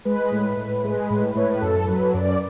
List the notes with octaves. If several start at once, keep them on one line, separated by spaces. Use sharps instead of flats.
G#3 B4
A2
A2
G#3
A2
A2 C#5
B4
F#2 A4
F#3 B4
F#2 D5